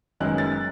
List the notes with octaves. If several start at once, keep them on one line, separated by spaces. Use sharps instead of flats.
F#1 F#2 D#3 G#3 B3 F#6
A6